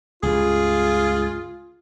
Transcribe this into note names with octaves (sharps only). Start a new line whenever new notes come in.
C#2 G2 F4 G#4